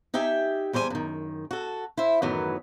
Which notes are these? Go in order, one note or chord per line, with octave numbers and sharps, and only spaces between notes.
D#4 G4 E5 G5 G#5
E2 G3 C5 D5 G#5
F#2 D#3
F#4 A4
E4 C5 E5
F#2 A2 D#3 E3 F#3 B3